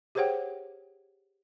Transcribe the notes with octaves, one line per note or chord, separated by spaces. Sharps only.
G4 G#4 C5 C#5 F#5 G5